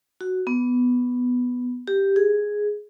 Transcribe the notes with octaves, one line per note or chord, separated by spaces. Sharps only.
F#4
B3
G4
G#4